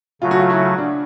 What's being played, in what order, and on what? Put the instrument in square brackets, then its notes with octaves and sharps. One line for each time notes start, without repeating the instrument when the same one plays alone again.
[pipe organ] C#3 F#3 A3 [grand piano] F4
[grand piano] F#4
F4
E4
D4